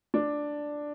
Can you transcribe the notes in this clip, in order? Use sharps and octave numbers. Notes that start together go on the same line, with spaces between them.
D4